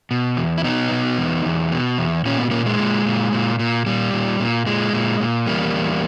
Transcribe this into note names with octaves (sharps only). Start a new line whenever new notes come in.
B2
E2
E4
B2 B3 D#4
B2
E2
E2
B2
E2
A#2 C#4
B3
A#2 A#3 C#4
G#3
A#2
A#2
A#2
A#2
A#2 G3
A#2
A#2
A#2 G#3
A#2
A#2
E2 G3 A#3
E2